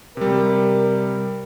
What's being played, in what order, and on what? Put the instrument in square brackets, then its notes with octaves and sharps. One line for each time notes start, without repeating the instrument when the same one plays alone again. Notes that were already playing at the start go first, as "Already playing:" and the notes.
[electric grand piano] C3 G3 [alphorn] A#4